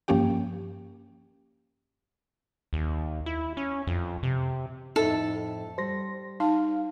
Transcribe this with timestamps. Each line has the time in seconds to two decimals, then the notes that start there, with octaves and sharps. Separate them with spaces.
0.08 G2 F3 A#3 C#4 G4 G5
2.73 D#2
3.26 E4
3.57 C#4
3.87 F2
4.23 C3
4.96 F2 A2 D#4 E4 A4
5.78 G3 C5 C6 A#6
6.40 D#4 F5 A5